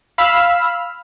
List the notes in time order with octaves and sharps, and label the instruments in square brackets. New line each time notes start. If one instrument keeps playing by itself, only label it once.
[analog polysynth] F5 B5 E6 F6